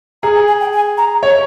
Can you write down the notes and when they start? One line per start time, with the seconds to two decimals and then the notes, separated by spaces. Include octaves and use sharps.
0.23 G#4 A#5
0.35 G#5
0.47 G#5
0.60 G5
0.72 G#5
0.97 A#5
1.23 C#5